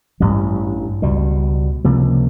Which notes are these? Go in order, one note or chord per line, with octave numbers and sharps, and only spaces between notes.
A1 G2 E3 G3
C#2 B2 G3
C#2 C3 F3 A#3